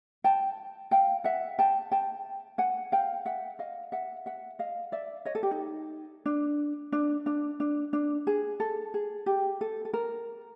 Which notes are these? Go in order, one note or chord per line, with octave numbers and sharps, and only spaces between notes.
G5 A5
F5 G5
E5 F#5
G5 A5
G5 A5
F#5 G#5
F5 G5
E5 F#5
D#5 F5
E5 F#5
E5 F#5
D#5 F5
D5 E5
C#5 D#5
A4
G4
D#4
D4
D4
D4
D4
D4
G#4
A4
G#4
G4
A4
A4
A#4